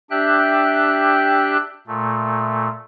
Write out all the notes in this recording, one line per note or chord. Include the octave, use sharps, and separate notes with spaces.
D4 G4 E5 G5 F#6
A#2 A3